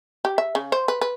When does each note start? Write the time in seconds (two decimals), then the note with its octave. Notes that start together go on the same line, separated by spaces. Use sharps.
0.25 G4
0.38 E5
0.55 C#3
0.72 C5
0.88 B4
1.01 B4